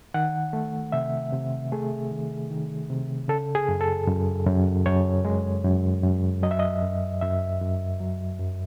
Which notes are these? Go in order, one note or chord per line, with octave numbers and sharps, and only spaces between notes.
D#3 F#5
A3
C3 E5
C3
A3 G#4
D#3
D#3
C3
C#3 A4
G#4
F#2
A4
F#2
F#2
F#2 C#5
G#3
F#2
F#2
F#3 D#5
E5
D#5
F#2
F#2 E5
F#2
F#3
F#2